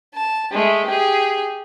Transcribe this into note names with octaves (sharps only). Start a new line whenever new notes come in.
A5
G#3 A3
G4 G#4